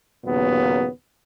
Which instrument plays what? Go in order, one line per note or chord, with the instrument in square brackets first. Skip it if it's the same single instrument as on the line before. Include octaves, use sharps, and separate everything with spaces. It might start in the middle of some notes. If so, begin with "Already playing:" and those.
[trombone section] D#2 A#2 C#3 F#3 B3